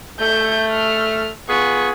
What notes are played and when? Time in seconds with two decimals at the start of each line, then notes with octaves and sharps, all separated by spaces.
0.20 A3 G6
0.72 F6
1.49 B3 F4 G#4 C#6